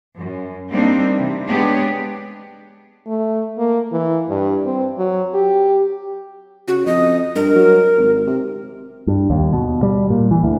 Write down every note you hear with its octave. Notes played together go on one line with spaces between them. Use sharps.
F#2
G3 A#3 C4 D4 D#4
C3 E3
G#3 B3 D4 G4 C#5
A3
A#3
E3
G2
C4
F#3
G4
C#3 F#4
F2 D#5
G2 A#4
F#3
G#1
C3
G2
D#2
B2
G3
A#2
E3
D2